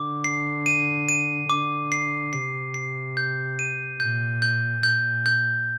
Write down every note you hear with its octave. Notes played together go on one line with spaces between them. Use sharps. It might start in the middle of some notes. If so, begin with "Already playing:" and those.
Already playing: D3 D6
C7
D#7
D#7
D3 D6
C7
C3 C7
C7
G6
D#7
A#2 G6
G6
A#2 G6
G6